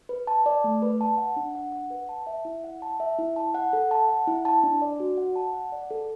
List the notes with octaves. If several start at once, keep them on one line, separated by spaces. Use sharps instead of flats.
B4
A5
D5
A3
B4
A5
F#5
D4
F#5
F#5
B4
A5
E5
E4
F#5
A5
E5
E4
A5
F#5
A4
A5
F#5
E4
A5
D4
D5
F#4
F#5
A5
F#5
D5
A4